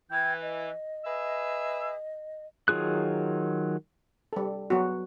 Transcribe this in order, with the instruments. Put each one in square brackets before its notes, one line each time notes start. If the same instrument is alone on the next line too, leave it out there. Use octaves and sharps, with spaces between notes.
[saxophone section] E3 [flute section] G5 G6 G#6
[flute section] D#5
[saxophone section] G#4 B4 E5
[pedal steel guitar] D#3 F#3 F4 G#4 F#6
[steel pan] G3 A4
F#3 B3 F#4